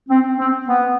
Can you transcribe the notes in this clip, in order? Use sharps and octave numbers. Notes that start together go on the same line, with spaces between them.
C4
C4
B3